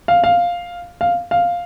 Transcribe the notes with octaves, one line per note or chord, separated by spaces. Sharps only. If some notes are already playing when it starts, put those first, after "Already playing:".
F5
F5
F5
F5